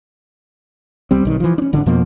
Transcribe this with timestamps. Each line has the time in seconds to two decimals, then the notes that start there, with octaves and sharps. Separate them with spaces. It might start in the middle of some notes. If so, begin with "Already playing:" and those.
1.11 C2 G3 C4
1.25 B1 D#3
1.40 E3 F3
1.58 C#4 D4
1.73 G#1 D3 C#4 D4
1.86 F2 B2 F3 A#3